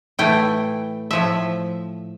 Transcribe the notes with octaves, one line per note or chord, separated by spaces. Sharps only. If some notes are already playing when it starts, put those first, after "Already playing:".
A2 E3 A3 E4 G5
A2 F3 A3 E5